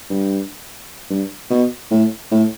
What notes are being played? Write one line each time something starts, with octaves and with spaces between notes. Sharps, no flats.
G2
G2
B2
A2
A2